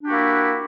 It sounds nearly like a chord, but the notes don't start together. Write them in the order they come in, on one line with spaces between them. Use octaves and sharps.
D4 G4 F#4 A#3 E4